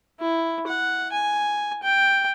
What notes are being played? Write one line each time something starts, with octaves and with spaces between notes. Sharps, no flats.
E4
F#5
G#5
G5